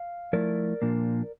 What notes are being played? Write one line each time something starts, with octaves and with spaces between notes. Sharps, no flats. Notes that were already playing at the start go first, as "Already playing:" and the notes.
Already playing: F5
F3 A3 E4 A#4 D5
A#2 F3 A#3 D4